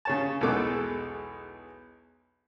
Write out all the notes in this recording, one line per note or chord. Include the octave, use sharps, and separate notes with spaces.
C#3 C#5 A5
B1 E2 B2 G#3 A4 D6